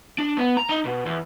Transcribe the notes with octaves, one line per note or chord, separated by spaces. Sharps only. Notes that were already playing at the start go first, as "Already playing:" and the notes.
D4
B3
A#5
D#4
B2
E2